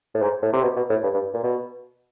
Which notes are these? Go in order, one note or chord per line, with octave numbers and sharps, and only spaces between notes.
A2
G#2
A2
C3
B2
B2
A2
G2
G2
A#2
B2